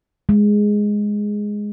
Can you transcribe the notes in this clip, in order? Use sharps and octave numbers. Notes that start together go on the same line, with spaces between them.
G#3